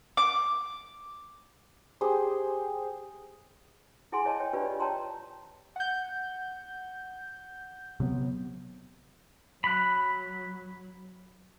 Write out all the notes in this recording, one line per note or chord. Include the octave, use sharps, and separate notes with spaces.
D6
G4 G#4 C5
E4 G#4 F#5 G#5 C6
E4 C#5 D#5 A5
C#5 G5
D4 F4 G4 B4 D5
D#5
C#5 G5 A5 A#5 C6
F#5 G6
C3 F#3 B3
F#3 B5 F#6